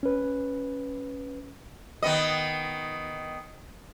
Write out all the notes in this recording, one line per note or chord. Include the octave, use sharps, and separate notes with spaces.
C#4 B4
D#3 B3 D#5